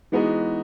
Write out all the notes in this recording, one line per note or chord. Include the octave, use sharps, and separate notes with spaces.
E3 G#3 B3 D#4 F#4